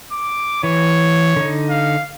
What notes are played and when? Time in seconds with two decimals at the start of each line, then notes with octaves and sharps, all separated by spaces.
0.12 D6
0.63 E3 C#5
1.36 D3 D#4
1.71 F5